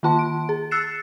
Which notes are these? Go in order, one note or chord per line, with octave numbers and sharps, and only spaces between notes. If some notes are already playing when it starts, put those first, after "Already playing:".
D#3 A#3 F4 A5 C6
D7
G#4
E6 F#6 A6 C7 C#7 E7